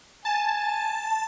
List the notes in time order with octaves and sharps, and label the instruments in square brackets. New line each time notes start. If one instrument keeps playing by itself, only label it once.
[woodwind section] G#5 [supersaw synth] A5